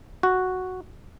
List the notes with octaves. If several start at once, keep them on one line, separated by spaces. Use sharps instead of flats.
F#4